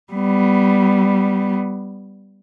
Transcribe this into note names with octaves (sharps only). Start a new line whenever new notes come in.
G3 B3